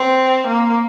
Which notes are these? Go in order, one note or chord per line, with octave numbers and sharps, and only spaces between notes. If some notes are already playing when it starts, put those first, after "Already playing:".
Already playing: C4
A#3